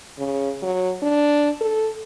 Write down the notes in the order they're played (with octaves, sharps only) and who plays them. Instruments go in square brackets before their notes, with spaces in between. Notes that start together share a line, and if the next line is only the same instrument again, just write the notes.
[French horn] C#3
F#3
D4
A4